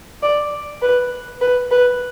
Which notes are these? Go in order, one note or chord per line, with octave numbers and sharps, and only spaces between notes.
D5
B4
B4
B4